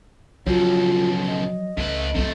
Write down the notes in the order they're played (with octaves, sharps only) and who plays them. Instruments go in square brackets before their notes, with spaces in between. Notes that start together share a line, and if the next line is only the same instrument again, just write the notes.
[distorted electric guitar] C#2 B2 [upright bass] F3 [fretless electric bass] F#3 [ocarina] F4
[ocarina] D#5
[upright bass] C#2 [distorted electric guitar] A2 B4
[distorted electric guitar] C3 A3 [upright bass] G#3 E4